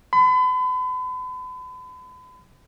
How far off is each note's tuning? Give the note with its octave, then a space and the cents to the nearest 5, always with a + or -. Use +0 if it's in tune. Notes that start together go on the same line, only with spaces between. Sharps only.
B5 +40